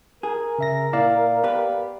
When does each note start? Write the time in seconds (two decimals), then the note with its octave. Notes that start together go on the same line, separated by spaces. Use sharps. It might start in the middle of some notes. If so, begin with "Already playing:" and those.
0.23 G#4 A#4
0.59 C#3 E5 A#6
0.93 A#2 E4 D5 F5
1.44 B3 G4 B4